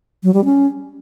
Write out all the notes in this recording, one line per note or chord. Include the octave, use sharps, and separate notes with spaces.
F#3
G3
C#4